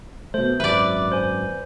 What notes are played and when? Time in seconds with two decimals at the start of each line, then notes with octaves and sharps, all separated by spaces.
0.34 B2 A3 C5
0.60 G#1 F#2 B4 D5 E5
0.74 D6 F#6
1.12 C5 G#5